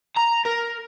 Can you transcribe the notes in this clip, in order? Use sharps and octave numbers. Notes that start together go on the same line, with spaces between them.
A#5
A#4